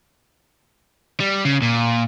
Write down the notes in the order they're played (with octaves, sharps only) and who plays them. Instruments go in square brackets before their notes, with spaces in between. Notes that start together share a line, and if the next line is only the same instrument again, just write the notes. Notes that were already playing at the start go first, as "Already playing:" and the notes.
[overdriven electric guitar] G3
C#3
A#2